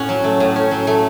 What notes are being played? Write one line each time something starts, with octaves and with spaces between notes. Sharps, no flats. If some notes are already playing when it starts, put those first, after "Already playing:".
Already playing: A2 C#4 F#5
F#3
A3
A2
C#4
F#3
A3